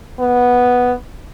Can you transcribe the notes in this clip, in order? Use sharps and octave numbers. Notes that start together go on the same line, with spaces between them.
B3